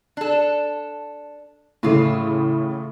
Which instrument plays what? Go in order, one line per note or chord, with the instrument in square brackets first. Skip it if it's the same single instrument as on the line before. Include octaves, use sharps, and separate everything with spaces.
[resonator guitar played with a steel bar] D4 A4
[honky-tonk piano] A2 C#3 A3 [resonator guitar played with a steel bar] E3 E4 F4